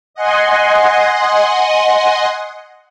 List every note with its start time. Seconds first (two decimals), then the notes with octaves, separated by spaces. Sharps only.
0.14 D#5 F#5 G#5 C6